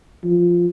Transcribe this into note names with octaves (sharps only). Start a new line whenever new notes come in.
F3